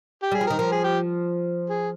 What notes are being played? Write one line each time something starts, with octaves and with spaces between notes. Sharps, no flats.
G4
G3 G#4
F3
A#4
D#3
F3 A#4
G#4
G4
G#4